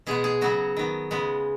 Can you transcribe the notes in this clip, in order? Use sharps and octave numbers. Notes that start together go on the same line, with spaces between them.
B2 G#3 B3 G#4
G#4
C#3 F#3 B3 F#4
D#3 B3
C#3 G#3 B3